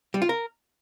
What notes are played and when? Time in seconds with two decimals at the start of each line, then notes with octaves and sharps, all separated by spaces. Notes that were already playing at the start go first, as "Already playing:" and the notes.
0.14 G3
0.22 F4
0.29 A#4